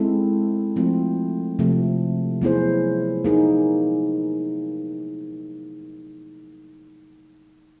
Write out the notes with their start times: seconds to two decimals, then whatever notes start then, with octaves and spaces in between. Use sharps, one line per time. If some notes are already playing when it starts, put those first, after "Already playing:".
Already playing: G#3 C4 E4 A4
0.76 F3 A3 C4 F4
1.59 C3 F3 A3
2.41 F#3 B3 E4 G#4 C5
3.24 A#3 D#4 G#4